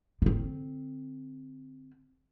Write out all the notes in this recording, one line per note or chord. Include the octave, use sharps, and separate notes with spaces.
D3 C4